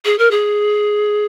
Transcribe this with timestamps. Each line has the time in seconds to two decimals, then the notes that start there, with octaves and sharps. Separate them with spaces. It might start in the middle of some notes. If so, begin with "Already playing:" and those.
0.05 G#4
0.18 A#4
0.31 G#4